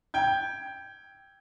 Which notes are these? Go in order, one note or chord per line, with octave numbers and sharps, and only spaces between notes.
G5 G6 G#6